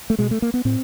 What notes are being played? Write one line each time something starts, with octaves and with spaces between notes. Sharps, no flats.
A3
B2 G#3
A3
A#3
B3
A2 C4